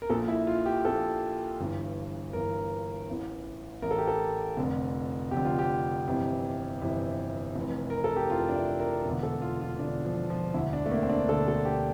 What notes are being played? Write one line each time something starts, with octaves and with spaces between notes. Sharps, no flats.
A#4
A#1 A#2 A4
E4
F4
G4
A#1 A#2 A4
G1 G2 E3
G1 G2 E3 A#4
A1 A2 E3
A1 A2 E3 A#4
A4
G4
A4
F1 F2 D3
F1 F2 D3 G4
F4
G4
G1 F2 C3 E3
G1 F2 C3 E3
F1 F2 E3
A#4
A4
G4
F1 F2 E3 F4
D4
E4
A#4
E1 E2 D3
A4
F4
F4
E1 E2 D3 D4
F3
F3
E1 D2 D3 E4
D4
A3
A#3
C4
D4
E1 D2 D3 A4
A4
G4